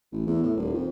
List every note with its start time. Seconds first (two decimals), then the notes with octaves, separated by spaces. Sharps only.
0.12 A1
0.27 E2
0.43 A2
0.57 D#1
0.74 F2